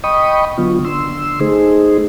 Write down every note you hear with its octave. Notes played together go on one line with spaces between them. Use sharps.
D#5 G5 B5 C#6 D#6
D3 F#3 B3 F4
D3 C6 E6
A3 D#4 G#4 C5